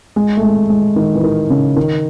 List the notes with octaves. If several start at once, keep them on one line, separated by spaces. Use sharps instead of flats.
G#3
A3
G#3
G#3
D#3
E3
D#3
C#3
D#3